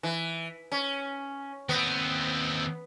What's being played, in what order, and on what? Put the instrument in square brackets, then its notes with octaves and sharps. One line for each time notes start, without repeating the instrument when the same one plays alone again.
[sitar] E3
C#4
[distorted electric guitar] D#2 C4 [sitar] B3